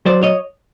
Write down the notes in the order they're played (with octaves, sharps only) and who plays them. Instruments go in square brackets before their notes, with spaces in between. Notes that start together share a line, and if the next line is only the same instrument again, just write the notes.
[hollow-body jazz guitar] F#3 C5 D5
C#5 D#5